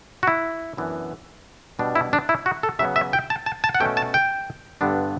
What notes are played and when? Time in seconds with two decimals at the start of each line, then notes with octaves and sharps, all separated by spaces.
0.23 F#4
0.27 E4
0.77 F#2 E3 B3 D4
1.79 B2 G3 D4
1.95 E4
2.13 D4
2.29 E4
2.46 F#4
2.63 A4
2.79 C#3 F#3 B3 E5
2.96 E5
3.13 G5
3.30 A5
3.46 A5
3.64 A5
3.75 F#5
3.80 B2 A3 C#4 G5
3.97 A5
4.14 G5
4.81 G2 D3 G3 B3 D4